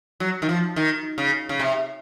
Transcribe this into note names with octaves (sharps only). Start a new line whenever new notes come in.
F#3
D#3
F3
D#3
C#3
C#3
C3